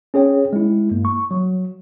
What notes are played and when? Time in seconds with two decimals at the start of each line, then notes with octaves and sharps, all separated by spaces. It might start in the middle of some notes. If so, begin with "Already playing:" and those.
0.14 C#4 G#4 C#5 G5
0.53 G#3 E4
0.91 G2 A#3
1.05 C#6
1.31 F#3